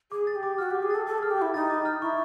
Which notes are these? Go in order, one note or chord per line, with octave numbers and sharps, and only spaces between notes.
G#4 D6
A6
G4
D6
F#4 F6
G4 D6
G#4
A4 A6
A4 D6
G#4 F6
G4
E4 D6
D#4 A6
D6
F6
E4 C#6